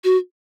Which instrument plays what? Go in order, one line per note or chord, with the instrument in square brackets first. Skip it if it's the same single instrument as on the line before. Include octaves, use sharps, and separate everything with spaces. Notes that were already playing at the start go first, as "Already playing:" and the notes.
[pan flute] F#4